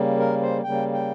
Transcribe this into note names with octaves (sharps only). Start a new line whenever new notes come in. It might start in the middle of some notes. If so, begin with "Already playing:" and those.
Already playing: C#3 G3 A#3
A#4
C5
C#3 G3 A#3 G5
G5